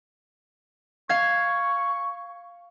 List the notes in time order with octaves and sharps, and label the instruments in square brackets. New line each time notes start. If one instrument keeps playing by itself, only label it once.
[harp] F5 G#6 [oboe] C#6